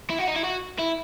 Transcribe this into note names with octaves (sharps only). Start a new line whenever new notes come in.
E4
F#4
D#4
E4
F#4
E4